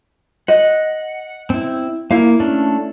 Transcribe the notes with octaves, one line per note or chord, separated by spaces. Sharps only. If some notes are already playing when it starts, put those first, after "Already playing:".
D#5 F#5
C4 E4
A#3 E4 F5
A3 C#4 D4